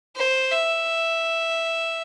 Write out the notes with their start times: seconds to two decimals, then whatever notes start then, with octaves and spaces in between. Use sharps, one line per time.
0.16 C5
0.51 E5